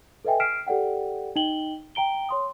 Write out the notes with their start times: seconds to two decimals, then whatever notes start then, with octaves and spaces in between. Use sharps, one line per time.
0.25 A4 B4 D#5 E5 G5 G#5
0.40 F6 B6 C7 D7 E7
0.67 G4 A4 D5 F#5 G5
1.36 D#4 D#5 G5 F#7 G7
1.95 G5 A#5 D7 G7
2.29 C#5 C6 D#6